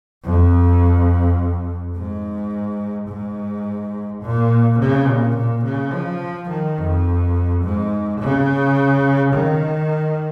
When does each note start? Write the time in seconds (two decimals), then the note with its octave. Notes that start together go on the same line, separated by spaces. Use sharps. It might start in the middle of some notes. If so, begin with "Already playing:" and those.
0.24 F2
1.95 G#2
3.08 G#2
4.22 A#2
4.79 C#3
5.08 A#2
5.36 A#2
5.64 C#3
5.92 F3
6.50 D#3
6.78 F2
7.63 G#2
8.20 C#3
9.34 D#3